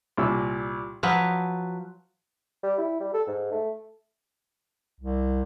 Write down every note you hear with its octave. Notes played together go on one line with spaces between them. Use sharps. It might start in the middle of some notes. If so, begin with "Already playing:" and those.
C2 A#2 E6
F3 F#3 B4
G3
E4
G3
A4
G#2
A3
C2